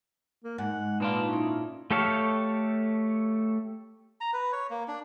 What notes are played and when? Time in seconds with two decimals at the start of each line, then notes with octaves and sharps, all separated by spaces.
0.44 A#3
0.58 G#2 F#5
1.00 A#2 D4 D#4 F4 B4
1.29 C#4 D#4 E4
1.91 A3 G4 A4 C#5 F5
4.21 A#5
4.33 B4
4.53 C#5
4.70 A#3
4.88 D4